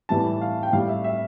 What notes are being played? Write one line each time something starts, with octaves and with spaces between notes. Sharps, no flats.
A2 E3 G3 A5
F5
G5
A2 G3 F5
E5
E5